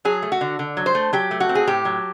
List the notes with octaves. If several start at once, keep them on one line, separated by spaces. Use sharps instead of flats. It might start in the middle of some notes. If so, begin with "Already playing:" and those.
F#3 G#4
A3
F#4
D3
D3
F#3
C5
A3
F#3 G4
A3
F#4
C4
G#4
A2 G4
F#3